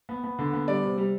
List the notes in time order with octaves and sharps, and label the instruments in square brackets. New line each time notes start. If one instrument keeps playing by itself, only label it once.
[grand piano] B3
B3
D3
B3
G3 D5
C3
G3